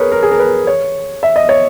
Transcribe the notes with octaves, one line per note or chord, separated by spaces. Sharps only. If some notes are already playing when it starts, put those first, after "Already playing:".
Already playing: G#4 A#4 B4 C#5
A#4
G#4
A#4
B4
C#5
E5
D#5
C#5